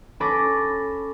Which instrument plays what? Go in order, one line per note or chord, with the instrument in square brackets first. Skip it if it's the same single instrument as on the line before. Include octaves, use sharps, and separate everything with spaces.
[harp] C#4 A4 B5 D6 A6 A#6